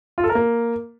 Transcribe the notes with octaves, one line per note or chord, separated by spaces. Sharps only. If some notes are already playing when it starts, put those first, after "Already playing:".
F4
A4
A#4
A#3